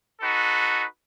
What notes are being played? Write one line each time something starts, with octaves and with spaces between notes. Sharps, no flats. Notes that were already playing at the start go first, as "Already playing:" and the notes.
D#4 F#4 A4 B4